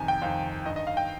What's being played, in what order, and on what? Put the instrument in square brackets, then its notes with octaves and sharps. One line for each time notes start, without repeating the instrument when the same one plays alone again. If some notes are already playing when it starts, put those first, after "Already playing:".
Already playing: [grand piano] F2 C3 D#3 G#5
G5
F2 C3 D#3 F5
G2 D#3 D#5
D#5
F5
G5